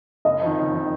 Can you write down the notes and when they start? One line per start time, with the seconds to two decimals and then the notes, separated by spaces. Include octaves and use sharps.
0.25 F#1 D#5
0.42 F2 D#3
0.58 F#1
0.74 D#3